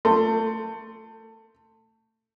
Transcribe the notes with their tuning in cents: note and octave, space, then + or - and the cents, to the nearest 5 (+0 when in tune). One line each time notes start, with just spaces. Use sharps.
A3 +20 C6 +0